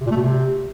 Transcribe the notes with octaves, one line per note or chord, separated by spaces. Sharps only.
C3
A#2
A3
B2
C3